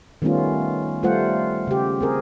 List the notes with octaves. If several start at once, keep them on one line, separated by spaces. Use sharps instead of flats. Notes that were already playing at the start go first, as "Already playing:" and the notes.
D#3 G3 A3 B3 C#4 F4
G3 A3 F4 C5 F#5
C#3 G4
C4 G#4 A#4